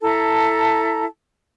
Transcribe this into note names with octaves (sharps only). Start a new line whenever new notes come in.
E4 A4 A5 A#5